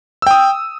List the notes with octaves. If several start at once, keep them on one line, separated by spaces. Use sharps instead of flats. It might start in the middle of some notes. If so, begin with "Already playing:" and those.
G5 D#6 E6